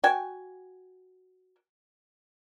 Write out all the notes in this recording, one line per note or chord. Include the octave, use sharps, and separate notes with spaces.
F#4 G5 G#5